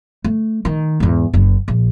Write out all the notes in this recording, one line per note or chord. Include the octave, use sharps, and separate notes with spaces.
A3
D#3
E2 G#2
F#1 F#2
A#1